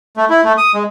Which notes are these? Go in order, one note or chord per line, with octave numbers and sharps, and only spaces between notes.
A3
E4
A3
D#6
G#3